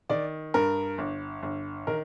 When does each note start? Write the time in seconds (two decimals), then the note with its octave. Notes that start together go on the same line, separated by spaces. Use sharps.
0.10 D#3 D5
0.54 G2 A#4
0.98 G1
1.43 G1
1.87 D#3 A#4